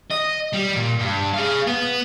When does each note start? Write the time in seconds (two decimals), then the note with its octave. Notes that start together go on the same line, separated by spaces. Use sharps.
0.11 D#5
0.54 G3
0.76 A#2
1.00 G2
1.34 G#4 F5
1.67 B3